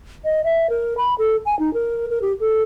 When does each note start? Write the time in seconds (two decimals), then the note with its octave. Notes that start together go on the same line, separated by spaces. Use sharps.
0.25 D#5
0.44 E5
0.70 A#4
0.97 B5
1.18 A4
1.46 G#5
1.59 D#4
1.74 A#4
2.10 A#4
2.22 G4
2.40 A4